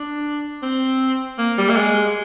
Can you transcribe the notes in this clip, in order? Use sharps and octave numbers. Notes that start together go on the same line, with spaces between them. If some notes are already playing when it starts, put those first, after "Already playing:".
Already playing: D4
C4
A#3
G3
A#3
G#3